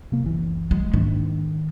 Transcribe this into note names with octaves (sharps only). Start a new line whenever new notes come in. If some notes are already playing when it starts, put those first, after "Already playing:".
C3 A#3
F#1 C#2 E3
G#3
G#2 D#3 A#3 D4